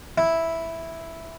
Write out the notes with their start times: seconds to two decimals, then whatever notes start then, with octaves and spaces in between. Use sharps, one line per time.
0.18 E4